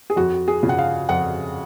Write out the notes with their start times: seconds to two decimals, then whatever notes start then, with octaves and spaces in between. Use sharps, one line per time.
0.10 G#4
0.16 F2 F#4
0.48 G#4
0.63 C#3 F3
0.69 F#5
0.78 F5
1.09 F2 F#5